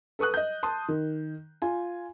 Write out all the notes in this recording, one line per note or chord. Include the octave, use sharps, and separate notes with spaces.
A4 B4 C#6 D#6 F#6
D#5 G6
A5 C6 D#6
D#3
F4 G#5